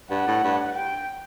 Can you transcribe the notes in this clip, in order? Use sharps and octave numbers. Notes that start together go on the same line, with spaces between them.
G2 F#5
A2
G2
G5